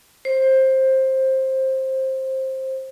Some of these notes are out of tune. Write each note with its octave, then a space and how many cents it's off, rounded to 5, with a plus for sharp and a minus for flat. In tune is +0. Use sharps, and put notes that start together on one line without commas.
C5 +15